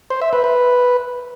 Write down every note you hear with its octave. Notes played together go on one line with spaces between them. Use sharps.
C5
E5
B4
B4